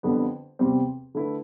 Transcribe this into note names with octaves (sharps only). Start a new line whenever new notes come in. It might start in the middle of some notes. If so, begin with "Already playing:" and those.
F2 D3 G3 B3
E2 C3 G3 C4
D3 A3 E4 B4